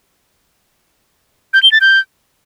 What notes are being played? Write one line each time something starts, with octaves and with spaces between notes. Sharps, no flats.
G6
G7
A6
G6